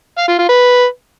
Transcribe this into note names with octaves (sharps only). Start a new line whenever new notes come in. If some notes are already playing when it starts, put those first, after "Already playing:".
F5
F4
F4
B4